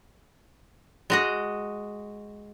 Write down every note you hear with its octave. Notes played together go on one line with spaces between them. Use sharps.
G#3 F#4 D#5